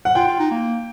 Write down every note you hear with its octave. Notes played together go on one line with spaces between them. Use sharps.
F#5
F4 G5
F4
D#4
A#3